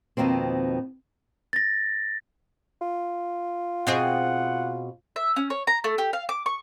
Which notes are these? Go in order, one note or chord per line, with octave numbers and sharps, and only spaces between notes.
F2 B2 D#3 A#3 C4
A6 A#6
F4
B2 C4 G#4 F#5
E5
C#4
C#5
A#5
A3
G4
F5
D6
C#6